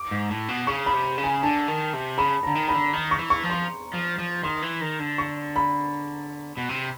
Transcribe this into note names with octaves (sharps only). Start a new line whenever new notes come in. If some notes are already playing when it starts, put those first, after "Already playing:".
Already playing: D6
G#2
A2
B2
C#3 C#6
B5
C3
C#3
G#5
D3 A5
D#3
C3
C#3 B5
D3 A#5
D#3
B5
D3
D#3
C#6
E3
C#6
F3
C6
F3
F3
D#3 C6
E3
D#3
D3
C#6
B5
B2
C3